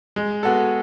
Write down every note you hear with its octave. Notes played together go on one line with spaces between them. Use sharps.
G#3
B3 F#4 A4